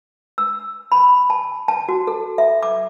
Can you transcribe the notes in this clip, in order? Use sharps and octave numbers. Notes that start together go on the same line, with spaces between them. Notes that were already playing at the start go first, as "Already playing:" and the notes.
E6
B5
A5
A5
F#4
A4
E5
D6